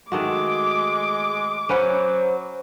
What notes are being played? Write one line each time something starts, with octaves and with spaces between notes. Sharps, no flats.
D#3 G#3 A3 F#4 D6
F#3 C#4 B4 C5 F#5